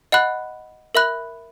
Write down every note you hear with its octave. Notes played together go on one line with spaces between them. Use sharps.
D#5 F#5 B5 F#6
A#4 E5 B5 F#6